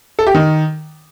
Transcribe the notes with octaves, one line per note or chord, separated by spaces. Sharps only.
A4
G4
D#3